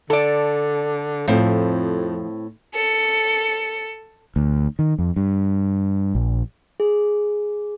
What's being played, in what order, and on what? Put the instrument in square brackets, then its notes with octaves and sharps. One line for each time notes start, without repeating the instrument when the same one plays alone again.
[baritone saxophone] D3 [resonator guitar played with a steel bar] A4 D5
[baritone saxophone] F2 [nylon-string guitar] A2 C4 [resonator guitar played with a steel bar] F3
[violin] A4 C#7
[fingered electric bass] D2
D#3
F2
G2
A#1
[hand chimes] G#4